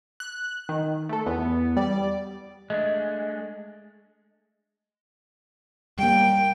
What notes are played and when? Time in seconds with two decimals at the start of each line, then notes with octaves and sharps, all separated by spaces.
0.20 F#6
0.69 D#3
1.09 A3 A4
1.26 E2 B3
1.77 G3 D5
2.70 G#3 A3 D4 D#5
5.99 G3 A#3 G5